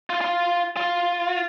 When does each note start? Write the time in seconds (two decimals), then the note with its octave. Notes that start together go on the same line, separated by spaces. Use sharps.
0.10 F4
0.21 F4
0.77 F4